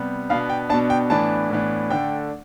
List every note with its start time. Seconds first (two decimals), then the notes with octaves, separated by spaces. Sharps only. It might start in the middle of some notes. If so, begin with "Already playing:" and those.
Already playing: C3 G3 B3
0.30 B2 B3 D4 F5
0.50 G5
0.69 B2 B3 D4 A5
0.90 G5
1.10 A2 E3 B3 D4 A5
1.50 A2 E3 B3 D4
1.90 D3 A3 D4 G5